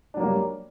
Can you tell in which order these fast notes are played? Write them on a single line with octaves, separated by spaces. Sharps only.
D4 F#3 A#3 G3